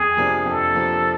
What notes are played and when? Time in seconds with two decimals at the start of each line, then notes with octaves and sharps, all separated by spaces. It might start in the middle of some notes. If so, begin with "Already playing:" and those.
Already playing: F2 G#4
0.17 C3 F3 A#3 D4
0.46 F2 A4
0.75 C3 F3 A#3 D4